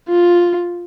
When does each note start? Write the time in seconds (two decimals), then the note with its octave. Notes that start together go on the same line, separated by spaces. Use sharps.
0.09 F4